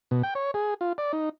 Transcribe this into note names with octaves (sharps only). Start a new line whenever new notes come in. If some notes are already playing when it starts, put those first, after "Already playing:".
B2
G5
C#5
G#4
F4
D5
D#4